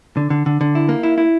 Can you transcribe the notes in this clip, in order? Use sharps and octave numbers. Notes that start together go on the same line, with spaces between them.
D3
D3
D3
D3
E4
A#3
E4
E4